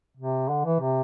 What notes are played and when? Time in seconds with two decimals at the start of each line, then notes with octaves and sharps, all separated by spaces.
0.17 C3
0.49 D3
0.65 E3
0.81 C3